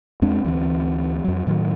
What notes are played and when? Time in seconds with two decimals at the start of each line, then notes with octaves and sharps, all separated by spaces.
0.22 E2 G#3 C4 D4
0.45 D2 E3 F#3 C4
1.24 F2 F#3
1.47 A2 D#3 E3 F#3